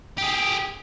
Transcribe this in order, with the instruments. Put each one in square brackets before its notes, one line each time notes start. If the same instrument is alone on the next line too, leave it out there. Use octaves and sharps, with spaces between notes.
[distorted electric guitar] G4 G#4